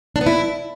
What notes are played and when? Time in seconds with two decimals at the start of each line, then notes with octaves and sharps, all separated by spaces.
0.16 D4
0.21 B3
0.26 E4